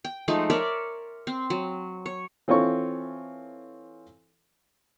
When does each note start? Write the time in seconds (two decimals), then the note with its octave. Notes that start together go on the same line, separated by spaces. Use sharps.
0.05 G5
0.28 F3 G#3 A3 D#4
0.50 A#4 C#5 D5 E5
1.27 C4
1.50 F#3
2.06 C#5
2.48 E3 C4 F4 A4 C#5 C#6